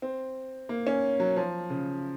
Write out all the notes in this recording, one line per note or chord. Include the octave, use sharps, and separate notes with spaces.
C4
A#3
C#4
F#3
F3
C#3